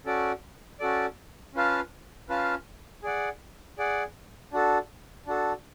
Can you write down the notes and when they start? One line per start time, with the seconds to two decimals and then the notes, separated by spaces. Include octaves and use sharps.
0.06 C#4 F#4 A4 D5
0.80 C#4 F#4 A4 D5
1.54 C#4 F4 B4 F5 A5
2.29 C#4 F4 B4 F5 A5
3.03 G#4 D5 F#5
3.78 G#4 D5 F#5
4.53 D4 F#4 A4
5.27 D4 F#4 A4